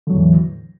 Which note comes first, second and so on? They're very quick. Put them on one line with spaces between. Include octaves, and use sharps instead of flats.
D3 F#3 E2 A2 E3